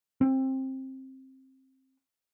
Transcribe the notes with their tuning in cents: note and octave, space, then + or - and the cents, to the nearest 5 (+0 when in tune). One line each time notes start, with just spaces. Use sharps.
C4 +15